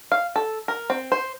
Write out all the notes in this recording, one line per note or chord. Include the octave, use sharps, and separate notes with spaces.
F5
A4
A#4
C4
C5